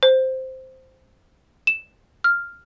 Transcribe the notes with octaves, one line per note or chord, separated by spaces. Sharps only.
C5
E7
F6